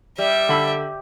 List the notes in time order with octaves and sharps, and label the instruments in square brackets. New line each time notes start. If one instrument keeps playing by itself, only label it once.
[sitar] G3 [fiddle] E5
[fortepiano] D3 B5 E6